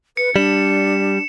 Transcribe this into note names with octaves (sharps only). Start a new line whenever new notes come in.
B4 C#7
G3 D4 E7